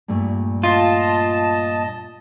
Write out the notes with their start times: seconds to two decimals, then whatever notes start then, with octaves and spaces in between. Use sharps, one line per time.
0.08 G2 A#2 A3
0.64 F4 D#5 A5